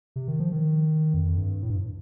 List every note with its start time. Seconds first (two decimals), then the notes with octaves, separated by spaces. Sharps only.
0.16 C3
0.28 D#3
0.40 F3
0.52 D#3
1.14 F2
1.38 G2
1.62 A2
1.70 G2